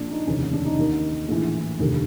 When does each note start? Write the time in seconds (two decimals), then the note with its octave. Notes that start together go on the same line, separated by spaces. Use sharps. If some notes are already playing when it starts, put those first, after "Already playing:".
Already playing: A#1 A#2 D4
0.11 D#4
0.27 F1 D#2 C#3 E3 C#4
0.40 C#4
0.53 D4
0.65 D#4
0.78 D#2 D#3
1.29 A#1 A2 E3 E4
1.79 F1 D#2 D3